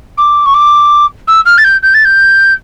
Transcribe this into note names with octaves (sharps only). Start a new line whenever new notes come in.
D6
C#6
D6
E6
F6
A6
G6
G6
A6
G6